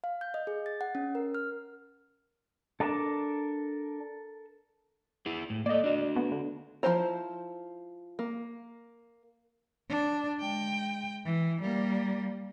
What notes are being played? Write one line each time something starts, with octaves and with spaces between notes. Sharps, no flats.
F5
G6
D#5
G#4
A6
F#5
C#4
A#4
F6
D4 A4 A#4 A5
E4 G#4
A2
A#3 A4 D5 D#5
D4 F#4
A3 B3
D3
F3 C#4 E4 C5 A#5
A#3
D4
G#3 G5
E3
G3 A#3